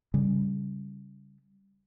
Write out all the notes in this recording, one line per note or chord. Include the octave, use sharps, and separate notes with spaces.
C#3 G3